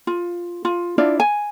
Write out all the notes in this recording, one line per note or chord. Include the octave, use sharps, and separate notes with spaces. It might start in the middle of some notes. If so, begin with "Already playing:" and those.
F4
F4
D4 E4 F4 D5
G#5